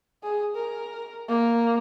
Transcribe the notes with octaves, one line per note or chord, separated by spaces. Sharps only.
G#4
A#4
A#3